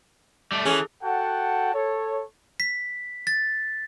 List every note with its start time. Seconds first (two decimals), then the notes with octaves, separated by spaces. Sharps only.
0.52 G3 A3
0.65 E3 C#4 G#4 A4
1.02 F#4 A4 F#5 G5 A5
1.74 A4 C#5
2.60 B6
3.27 A6